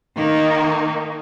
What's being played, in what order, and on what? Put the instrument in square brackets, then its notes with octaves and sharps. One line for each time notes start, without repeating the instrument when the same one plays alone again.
[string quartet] D#3 A#3 D#4